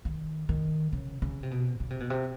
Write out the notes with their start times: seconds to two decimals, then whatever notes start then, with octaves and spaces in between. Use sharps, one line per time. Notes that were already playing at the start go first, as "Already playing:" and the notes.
0.05 D#3
0.49 D#3
0.93 C#3
1.22 C#3
1.43 C3
1.51 B2
1.80 C#3
1.90 C3
2.00 B2
2.10 C3